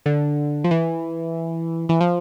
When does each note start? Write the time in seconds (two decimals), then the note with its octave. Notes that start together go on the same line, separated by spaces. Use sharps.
0.06 D3
0.64 F3
0.71 E3
1.89 E3
2.01 F3